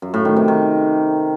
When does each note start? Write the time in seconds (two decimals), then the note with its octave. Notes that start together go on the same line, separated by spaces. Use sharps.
0.02 F#2
0.14 A2
0.25 D#3
0.36 C3
0.48 D#3